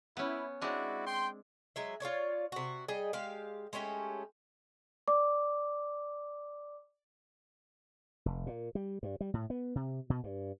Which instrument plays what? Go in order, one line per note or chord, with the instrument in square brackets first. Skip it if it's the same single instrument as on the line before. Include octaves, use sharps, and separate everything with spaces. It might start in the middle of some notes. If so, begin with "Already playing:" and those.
[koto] B3 C#4 [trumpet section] E4
[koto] G#3 C4 D4 [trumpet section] E4 F#4 D5
[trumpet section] G5 C6
[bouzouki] F#3 G#3 E5
F4 G#4 C#5 D5
C3 F#4
G3 G#4 D#5 G5
G#3 G4 F5
G#3 A3 C#4 G4
[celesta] D5 D6
[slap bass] F1
A#2
G3
G2
G3
A2
B3
C3
B2
G2